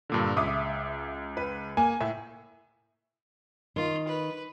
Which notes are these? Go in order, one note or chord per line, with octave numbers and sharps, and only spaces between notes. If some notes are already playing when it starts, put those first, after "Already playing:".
G2 A#2 D3
C#2 E5 D6 D#6
B4
A#3 G#5
A2 E5
D#3 F4
B4